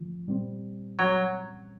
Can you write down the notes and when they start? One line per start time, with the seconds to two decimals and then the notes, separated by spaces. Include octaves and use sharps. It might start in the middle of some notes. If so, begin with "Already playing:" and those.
Already playing: D3 F3 A3 F4
0.28 A#2 G3 C4
0.99 F#3